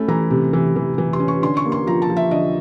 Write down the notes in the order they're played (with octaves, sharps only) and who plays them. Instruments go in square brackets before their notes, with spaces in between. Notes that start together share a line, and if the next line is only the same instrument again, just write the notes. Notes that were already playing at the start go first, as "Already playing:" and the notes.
Already playing: [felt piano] A3 C#4 B5
E3 A#5
C3
E3
E3
E3
C6
C#4
C#6
D3 C6
C#6
A#3
C6
F3 A#5
A5
F3
E5
D3 D#5